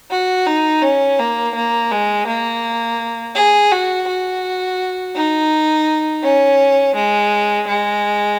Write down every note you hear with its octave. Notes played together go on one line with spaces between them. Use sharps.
F#4
D#4
C#4
A#3
A#3
G#3
A#3
G#4
F#4
F#4
D#4
C#4
G#3
G#3